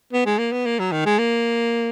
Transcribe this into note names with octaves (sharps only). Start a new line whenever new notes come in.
B3
G#3
A#3
B3
A#3
F#3
D#3
G#3
A#3